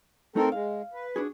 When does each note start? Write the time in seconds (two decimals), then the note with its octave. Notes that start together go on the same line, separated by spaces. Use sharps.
0.36 A3 C4 D#4 A4 A#4 C5
0.52 G#3 F5
0.93 B4
1.16 D4 F#4 G#4